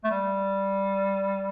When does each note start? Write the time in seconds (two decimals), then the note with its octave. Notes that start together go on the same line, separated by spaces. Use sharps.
0.04 A3
0.11 G3